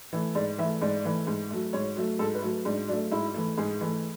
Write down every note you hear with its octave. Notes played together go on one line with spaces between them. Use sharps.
E3 A3
G#2 D5
E3 A3 E5
G#2 D5
E3 A3
G#2
F#3 A3
G#2 C#5
F#3 A3
G#2 A4
B4
F#3 A3
G#2 D4
F#3 A3 D4
G#2 E4
E3 A3
G#2 G#4
E3 A3